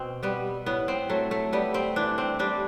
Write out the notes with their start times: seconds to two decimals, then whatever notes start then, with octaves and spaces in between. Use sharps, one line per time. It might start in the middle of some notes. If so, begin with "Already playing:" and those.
Already playing: B2 C4
0.23 G3 B3
0.66 A2 B3
0.88 C4
1.09 F#3 A3
1.31 A3
1.53 G3 B3
1.74 C4
1.96 E3 D4
2.18 C4
2.39 G3 D4